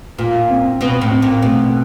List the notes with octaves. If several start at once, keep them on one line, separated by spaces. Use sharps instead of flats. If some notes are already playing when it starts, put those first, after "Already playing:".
A#2 F4
C4
B2 C4
A2
C4
A#2
B2 A3